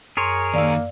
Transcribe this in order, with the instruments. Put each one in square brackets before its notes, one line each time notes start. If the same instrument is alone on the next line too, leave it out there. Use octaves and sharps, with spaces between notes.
[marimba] F#2 C6 [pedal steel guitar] G#4 A#4 C#5
[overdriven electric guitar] D#2 D#3 [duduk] A#3 [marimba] D5 F5 E6